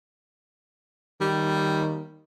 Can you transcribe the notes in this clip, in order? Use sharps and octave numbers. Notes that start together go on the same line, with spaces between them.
D#3 G3